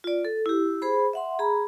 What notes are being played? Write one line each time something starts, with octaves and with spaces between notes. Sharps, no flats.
F4 D5
A4
E4 G4
G#4 C5 B5
E5 F#5 C6
G#4 A#5 B5